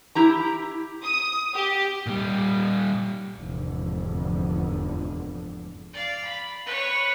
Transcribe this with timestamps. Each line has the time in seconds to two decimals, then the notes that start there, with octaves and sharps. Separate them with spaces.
0.15 E4 G4 A#5
1.04 D#6
1.56 G4
2.06 A#2 G3
3.36 F1 E2 G#2 D3 F3
5.93 D5 F5
6.24 B5
6.65 B4 C#5